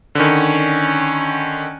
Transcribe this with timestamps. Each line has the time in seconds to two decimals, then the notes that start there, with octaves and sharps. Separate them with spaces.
0.15 D3 D#3 C#4